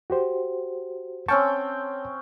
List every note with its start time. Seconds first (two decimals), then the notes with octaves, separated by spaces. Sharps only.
0.10 F#4 G4 C5
1.28 C4 C#4 G5 A5 C#6